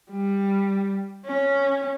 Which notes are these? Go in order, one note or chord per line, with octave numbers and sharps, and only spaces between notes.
G3
C#4